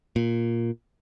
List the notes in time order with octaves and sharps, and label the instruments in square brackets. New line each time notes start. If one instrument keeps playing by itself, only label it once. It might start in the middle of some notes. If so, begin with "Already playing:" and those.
[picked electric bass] A#2